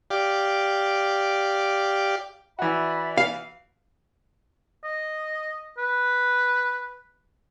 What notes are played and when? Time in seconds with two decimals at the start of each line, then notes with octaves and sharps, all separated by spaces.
0.11 G4 D5 F5
2.59 E3 F#4 D5 E5 B5
3.18 F5
4.84 D#5
5.78 B4